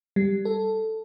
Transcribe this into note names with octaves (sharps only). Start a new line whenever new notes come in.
G3
A4